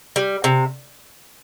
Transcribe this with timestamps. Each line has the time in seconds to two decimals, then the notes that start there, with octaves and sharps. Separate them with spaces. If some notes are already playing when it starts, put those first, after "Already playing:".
0.16 G3
0.44 C3